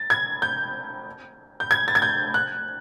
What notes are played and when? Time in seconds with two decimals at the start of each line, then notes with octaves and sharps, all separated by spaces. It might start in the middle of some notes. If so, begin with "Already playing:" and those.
Already playing: A6
0.10 G#6
0.42 G6
1.60 G6
1.71 G#6
1.88 A6
1.95 G#6
2.02 G6
2.34 F#6